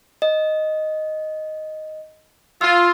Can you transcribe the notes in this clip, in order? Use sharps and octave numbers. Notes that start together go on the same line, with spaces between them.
D#5
F4 E6